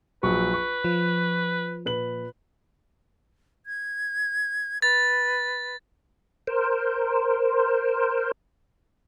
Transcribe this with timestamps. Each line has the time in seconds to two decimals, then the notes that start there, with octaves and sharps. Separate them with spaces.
0.23 A#1 F#3 B4 C#6
0.53 C#6
0.84 F3
1.85 A#2 B4 F#7
3.66 G#6
4.82 B4 A6
6.47 A#4 C5